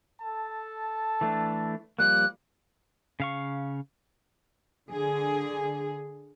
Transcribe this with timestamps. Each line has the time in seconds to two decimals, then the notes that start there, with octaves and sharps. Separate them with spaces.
0.22 A4 A5
1.21 E3 A3 D4
1.99 F3 G3 A#3 F#6
3.20 C#3 F5 C#6
4.90 D3 G#4